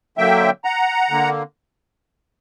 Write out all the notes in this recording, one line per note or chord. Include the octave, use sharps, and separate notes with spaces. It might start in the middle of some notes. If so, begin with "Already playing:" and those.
D3 F#3 A#3 E5 G5
F#5 A#5
D3 A#3